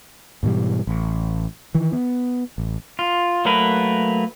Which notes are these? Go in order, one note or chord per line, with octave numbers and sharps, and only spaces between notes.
G#2 B2 E3 G3
A1
D#3 E3
B3
A1
F4
F#3 A3 A#3 A#4 B4